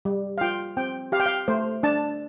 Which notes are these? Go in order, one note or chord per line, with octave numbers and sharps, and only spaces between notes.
G3
F5
F4 G5
C4 G5
G4 F5
G5
F5
A3 C5
D4 A5